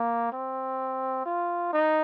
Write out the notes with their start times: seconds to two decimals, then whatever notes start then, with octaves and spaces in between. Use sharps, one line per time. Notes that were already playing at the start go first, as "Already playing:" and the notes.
Already playing: A#3
0.33 C4
1.26 F4
1.73 D#4